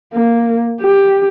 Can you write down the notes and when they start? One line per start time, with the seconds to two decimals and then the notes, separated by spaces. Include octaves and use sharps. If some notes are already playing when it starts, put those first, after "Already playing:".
0.14 A#3
0.81 G4